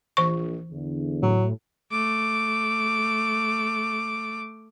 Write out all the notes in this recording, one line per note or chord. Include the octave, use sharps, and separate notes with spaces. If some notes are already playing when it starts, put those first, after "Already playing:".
A#1 E3 C#6
E2 D3
A2 F#3
A3 D6